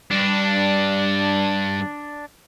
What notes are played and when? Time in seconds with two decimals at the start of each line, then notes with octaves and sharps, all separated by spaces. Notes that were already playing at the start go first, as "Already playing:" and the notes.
0.11 G2 D4